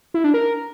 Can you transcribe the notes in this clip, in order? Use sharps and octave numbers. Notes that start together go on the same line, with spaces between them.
E4
D4
A#4